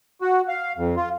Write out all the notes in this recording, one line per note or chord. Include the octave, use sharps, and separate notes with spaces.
F#4
F5
F2
F4